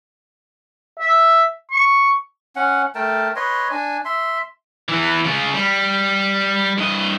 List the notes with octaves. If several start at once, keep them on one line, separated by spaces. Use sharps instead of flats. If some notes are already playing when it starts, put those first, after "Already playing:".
E5
C#6
C#4 F#5
A3 A#4 G5 A5
B4 C#5 D#5 C6
D4 G#5
E5 C6
E3 B3
C#3 F4
G3
G2 D#5